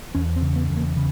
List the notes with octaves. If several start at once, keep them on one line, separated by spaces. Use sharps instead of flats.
E2 C#4
C4
C#3
B3
E2
A#3
C#3